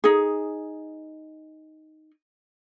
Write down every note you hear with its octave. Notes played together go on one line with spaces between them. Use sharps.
D#4 G#4